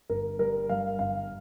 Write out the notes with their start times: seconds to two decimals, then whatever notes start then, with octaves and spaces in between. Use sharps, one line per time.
0.10 G1 A#4
0.39 G3 A#4
0.69 G2 F5
0.99 G1 F5